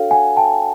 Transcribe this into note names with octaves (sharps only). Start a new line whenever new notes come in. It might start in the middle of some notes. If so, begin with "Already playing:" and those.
Already playing: D4 F#4 A4 C#5 F5 G5
F#5 G#5
G5 A5